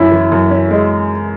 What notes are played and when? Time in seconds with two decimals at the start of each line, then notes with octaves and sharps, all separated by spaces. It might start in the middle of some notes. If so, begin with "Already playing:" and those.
Already playing: F#2 C#4 E4
0.11 E3
0.32 F#2
0.50 C#4
0.71 G#3